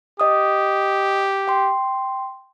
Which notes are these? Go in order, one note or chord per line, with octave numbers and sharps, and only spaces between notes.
G4 D#5 D#6
G5 C6